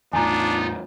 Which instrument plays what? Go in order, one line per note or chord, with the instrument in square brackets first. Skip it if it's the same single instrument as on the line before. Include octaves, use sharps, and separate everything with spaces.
[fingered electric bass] E2 A2 [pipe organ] B3 D#4 F4 [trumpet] D4 [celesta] G#5 A#5